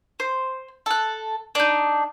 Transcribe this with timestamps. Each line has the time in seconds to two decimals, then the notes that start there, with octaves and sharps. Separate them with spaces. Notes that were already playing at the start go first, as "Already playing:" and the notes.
0.20 C5
0.86 A4 F#6
1.55 D4 D#4